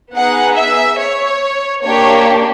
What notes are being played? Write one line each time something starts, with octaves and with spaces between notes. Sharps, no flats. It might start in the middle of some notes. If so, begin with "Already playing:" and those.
B3 D#4 G#4 F#5
E5
C#5
A#3 D4 G4 C#5